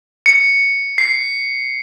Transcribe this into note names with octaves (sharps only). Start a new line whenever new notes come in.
C#7
C7